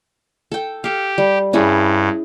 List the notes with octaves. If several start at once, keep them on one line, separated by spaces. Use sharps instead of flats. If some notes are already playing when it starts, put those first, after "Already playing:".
A4 G5
G4 A4 F5
G3
G2 C#4 E4 G#4